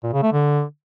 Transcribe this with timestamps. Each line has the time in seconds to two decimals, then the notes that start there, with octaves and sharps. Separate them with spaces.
0.03 A#2
0.13 C#3
0.23 A3
0.33 D3